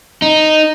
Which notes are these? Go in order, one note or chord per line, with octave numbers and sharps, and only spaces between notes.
D#4